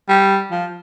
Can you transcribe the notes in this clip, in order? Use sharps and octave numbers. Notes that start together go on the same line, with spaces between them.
G3
F3